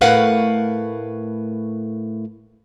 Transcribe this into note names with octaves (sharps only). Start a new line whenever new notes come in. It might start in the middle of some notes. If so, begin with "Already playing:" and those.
A2 A3 A#4 B4 F5 F#5